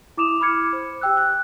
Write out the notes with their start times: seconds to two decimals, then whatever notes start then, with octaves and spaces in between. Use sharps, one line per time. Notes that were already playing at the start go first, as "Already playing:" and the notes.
0.17 E4 D6 D#6 E7 F7
0.41 B5 D6 F6 G#6 C#7
0.73 C5
1.01 G4 C5 G5 E6 F#6
1.17 F#6